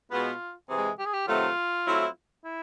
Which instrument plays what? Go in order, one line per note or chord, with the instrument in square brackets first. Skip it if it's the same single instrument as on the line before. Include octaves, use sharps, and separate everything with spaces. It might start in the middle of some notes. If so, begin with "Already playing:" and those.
[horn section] B2 G#3 B3 [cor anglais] F4
[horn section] C3 E3 G#3 [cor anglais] G#4
[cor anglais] G4
G#4
G4
[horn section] C3 D#3 F#3 A3 [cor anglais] F4
[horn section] F#3 A3 C4 E4
[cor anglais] E4